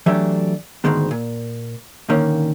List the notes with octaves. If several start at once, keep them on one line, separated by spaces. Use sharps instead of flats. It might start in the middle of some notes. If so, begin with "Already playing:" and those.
E3 F#3 A3 D4 G4 E5
D2 G#2 D#3 G#3 B3
A#2
A#2 D3 D#3 A#3 C#4